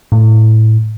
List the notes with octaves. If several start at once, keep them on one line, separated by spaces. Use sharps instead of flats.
A2